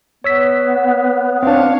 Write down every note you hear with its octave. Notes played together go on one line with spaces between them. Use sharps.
B3 C#5 E6 B6
C4 D4 C#5 F5